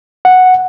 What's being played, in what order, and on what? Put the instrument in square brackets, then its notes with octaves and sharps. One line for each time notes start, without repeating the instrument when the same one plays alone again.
[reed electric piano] F#5